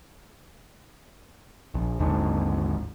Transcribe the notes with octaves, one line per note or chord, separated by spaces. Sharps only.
A#1
G#1 D#2 G#2 D3